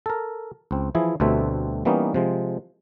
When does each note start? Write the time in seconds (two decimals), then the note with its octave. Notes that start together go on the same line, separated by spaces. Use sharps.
0.06 A4 A#4
0.71 C#2 C4
0.95 E3 F3 E4 G#4
1.20 D2 B2 G3 A3 C4 E5
1.85 E3 G3 A#3 B3 C#4 D#4
2.14 C3 F3 G#3